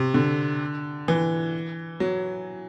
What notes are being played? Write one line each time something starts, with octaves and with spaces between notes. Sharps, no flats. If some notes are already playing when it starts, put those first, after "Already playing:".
Already playing: C3
D3
E3
F#3